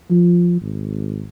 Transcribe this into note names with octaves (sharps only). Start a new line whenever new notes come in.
F3
G#1